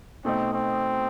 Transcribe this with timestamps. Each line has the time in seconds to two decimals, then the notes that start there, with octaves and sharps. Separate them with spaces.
0.25 B2 A3 C4 D#4
0.53 C4